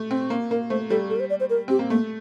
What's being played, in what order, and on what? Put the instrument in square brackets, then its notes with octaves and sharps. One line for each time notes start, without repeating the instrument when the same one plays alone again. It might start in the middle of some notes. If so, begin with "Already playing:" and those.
Already playing: [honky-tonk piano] A3
C4
A#3
[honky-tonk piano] A#3 [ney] A#4
[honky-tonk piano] A3 [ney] C5
[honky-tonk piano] G3 [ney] A4
[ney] A4
A#4
C5
D5
C5
A#4
[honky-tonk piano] C4 [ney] G4
[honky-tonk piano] A#3
[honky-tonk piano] A3 [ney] A#3